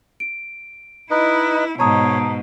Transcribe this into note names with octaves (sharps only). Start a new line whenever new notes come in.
D7
D#4 E4 B4 D#5
G#2 B2 C#5 A5 A#5 D#6